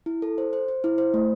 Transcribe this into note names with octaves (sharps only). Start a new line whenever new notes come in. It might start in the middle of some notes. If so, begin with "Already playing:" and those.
E4
A4
C5
C5
C5
E4
C5
A3